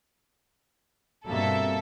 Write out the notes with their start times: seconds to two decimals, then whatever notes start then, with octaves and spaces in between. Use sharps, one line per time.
1.26 G2 B2 A#3 C4 A4 E5